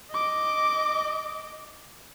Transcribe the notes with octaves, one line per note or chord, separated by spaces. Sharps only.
D#5 D6